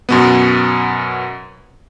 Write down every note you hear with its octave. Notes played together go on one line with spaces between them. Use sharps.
F#2 B2 B3